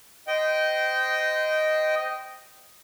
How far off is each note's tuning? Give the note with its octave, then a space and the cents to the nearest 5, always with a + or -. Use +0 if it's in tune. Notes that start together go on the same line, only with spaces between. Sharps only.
C5 -25 D#5 +0 G5 -15